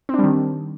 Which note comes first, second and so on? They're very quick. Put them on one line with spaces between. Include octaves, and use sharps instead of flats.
C4 D4 G3 D#3